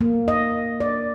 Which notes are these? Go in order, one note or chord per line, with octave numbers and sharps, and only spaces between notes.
A#3
D#5
D5